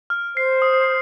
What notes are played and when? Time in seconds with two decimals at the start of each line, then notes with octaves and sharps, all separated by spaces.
0.10 F6
0.36 C5 C7
0.62 D#6